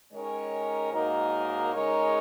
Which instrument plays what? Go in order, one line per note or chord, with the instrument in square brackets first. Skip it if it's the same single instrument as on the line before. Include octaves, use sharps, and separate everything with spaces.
[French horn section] D#3 G#3 C#4 A#4 C#5
G#2 F#3 A#3 D#4 A#4
C#3 G#3 D#4 A#4 C#5